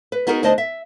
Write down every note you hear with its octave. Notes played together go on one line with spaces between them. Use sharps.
B4
B3 D#4 F#4 G#4 A#4
D2 D4 C5 D#5 A5
E5